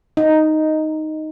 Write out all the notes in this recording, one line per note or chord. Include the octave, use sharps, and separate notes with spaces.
D#4